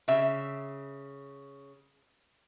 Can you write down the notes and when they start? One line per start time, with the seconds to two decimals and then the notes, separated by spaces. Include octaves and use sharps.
0.08 C#3 E5